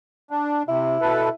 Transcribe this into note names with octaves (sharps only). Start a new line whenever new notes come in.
D4
C3 E4
B2 A4 B4